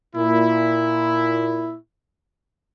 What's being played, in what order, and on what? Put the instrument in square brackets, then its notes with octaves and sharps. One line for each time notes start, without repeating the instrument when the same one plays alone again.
[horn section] A#2 E4